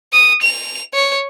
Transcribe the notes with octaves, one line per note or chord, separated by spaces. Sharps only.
D#6
F7
C#5